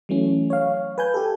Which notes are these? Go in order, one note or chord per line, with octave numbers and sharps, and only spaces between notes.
E3 F#3 A3 C#4
C#5 F5
B4 G#5 G6
G4 A4